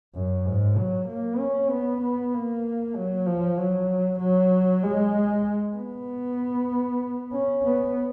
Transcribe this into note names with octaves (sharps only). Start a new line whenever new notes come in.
F#2
G#2
F#3
A#3
C#4
B3
B3
A#3
F#3
F3
F#3
F#3
G#3
B3
C#4
B3